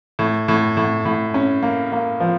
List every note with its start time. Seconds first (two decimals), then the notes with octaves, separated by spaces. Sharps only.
0.19 A2
0.48 A2
0.77 A2
1.05 A2
1.34 C#4
1.63 A#3
1.92 A#3
2.20 F3